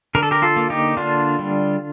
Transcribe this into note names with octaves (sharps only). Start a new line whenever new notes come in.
D3 A#4
A4
G4 A#4
F4 A4
A#3
D#4 G4
D3 D4 F4
G3